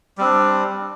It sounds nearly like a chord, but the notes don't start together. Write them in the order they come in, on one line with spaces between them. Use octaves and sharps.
G3 C4 D4